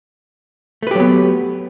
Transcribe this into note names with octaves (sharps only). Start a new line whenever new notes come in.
F#3 A3 B3 G4 B4